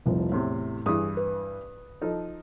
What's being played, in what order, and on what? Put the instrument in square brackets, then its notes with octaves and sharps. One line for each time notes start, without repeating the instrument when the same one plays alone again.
[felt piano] F1 C2 F3
[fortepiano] E2 C3 [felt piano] A2
[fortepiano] G2 E3 [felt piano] G#4 D#6
[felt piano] B4
[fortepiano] F3 D#4 A4